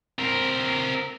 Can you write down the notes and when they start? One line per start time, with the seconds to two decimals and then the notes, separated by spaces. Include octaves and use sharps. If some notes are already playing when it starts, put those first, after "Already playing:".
0.19 C4 A#4